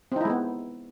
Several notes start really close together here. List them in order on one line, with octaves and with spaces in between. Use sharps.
C4 D#4 E4 G#3 B3